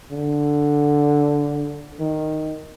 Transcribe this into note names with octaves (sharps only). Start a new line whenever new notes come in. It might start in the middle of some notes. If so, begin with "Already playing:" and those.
D3
D#3